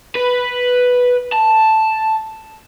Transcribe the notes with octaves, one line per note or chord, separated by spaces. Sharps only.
B4
A5